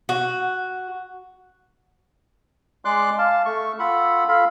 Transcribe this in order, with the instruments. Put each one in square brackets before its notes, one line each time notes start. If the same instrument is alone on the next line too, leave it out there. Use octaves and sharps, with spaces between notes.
[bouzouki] F#4
[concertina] G#3 D5 C6 D6 F#6
F5 A5
A3 C#6
F4 A4 F#5 B5
F4 A4 F5 B5